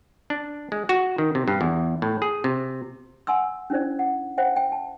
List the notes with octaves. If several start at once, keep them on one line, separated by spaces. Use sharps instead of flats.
D4
G#3
F#4
D#3
C3
G2
E2
A2
G#4
C3
F#5 G#5 C6 E6
C#4 D4 E4 C5 D5
F#5
C5 E5 F#5 G5
G5
A5